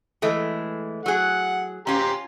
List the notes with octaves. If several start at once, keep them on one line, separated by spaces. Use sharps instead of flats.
E3 G#3 A3
F#3 G#4 F#5
C#4 F4 G4 A#5 C6